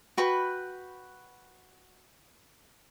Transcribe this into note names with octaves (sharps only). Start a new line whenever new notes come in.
F#4 B4 G5 B5